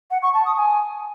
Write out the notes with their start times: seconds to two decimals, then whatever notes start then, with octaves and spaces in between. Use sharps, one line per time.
0.11 F#5
0.22 C#6
0.34 A5
0.45 D#6
0.57 G#5